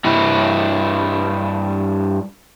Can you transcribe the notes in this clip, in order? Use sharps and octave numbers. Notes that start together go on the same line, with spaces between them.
G2 E4